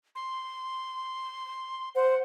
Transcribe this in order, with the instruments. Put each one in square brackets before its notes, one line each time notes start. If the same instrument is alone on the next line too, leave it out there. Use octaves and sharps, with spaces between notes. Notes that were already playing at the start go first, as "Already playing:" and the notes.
[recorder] C6
[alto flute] C5 [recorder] F#5